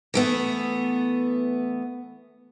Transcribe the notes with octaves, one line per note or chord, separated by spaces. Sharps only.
E3 A3 B3